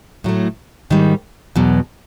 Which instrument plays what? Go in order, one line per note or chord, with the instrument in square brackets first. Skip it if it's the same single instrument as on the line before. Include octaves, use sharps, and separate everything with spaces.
[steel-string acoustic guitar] A2 F#3 A3
G#2 D#3 G3 A#3
E2 B2 F#3